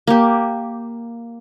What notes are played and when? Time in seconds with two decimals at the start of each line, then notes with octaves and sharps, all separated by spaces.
0.07 A#3 G4